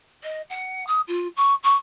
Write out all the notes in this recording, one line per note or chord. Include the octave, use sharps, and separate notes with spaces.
D#5
F#5
D#6
F4
C#6
C#6